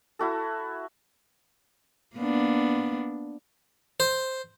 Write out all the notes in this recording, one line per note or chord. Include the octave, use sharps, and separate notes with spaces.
E4 F#4 A4
A#3 B3 D4
C5